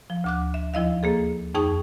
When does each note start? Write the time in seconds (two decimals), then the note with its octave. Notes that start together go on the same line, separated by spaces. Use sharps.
0.10 F3
0.24 D2 D6 F#6
0.54 E5
0.74 D#2 F3 E4 D#5 F5
1.03 A#3 G#4 A4
1.55 F2 D#4 G#4 G5 C#6 D#6